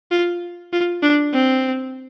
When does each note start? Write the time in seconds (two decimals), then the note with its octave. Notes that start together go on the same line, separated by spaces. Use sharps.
0.11 F4
0.73 F4
1.02 D4
1.33 C4